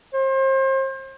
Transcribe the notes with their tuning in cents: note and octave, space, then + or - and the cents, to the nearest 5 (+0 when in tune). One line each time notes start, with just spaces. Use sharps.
C5 +35